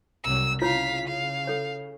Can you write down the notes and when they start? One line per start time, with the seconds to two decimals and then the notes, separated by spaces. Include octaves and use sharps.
0.24 C2 F#3 E6
0.61 C#3 E4 F4 C#5 F5 B6
1.07 F5
1.47 A4 C#5